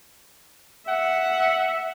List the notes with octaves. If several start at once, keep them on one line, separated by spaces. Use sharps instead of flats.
E5 F#5